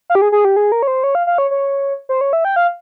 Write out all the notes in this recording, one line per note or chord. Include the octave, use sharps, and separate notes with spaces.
F5
G4
G#4
G#4
G4
G#4
A#4
C#5
C5
C#5
F5
F5
C#5
C#5
C5
C#5
E5
G5
F5